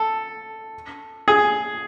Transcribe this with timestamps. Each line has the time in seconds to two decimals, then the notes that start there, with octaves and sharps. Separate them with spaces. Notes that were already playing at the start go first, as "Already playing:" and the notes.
Already playing: A4
1.28 G#4